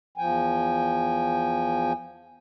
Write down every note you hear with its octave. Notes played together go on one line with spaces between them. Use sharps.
E2 F3 G5 G#5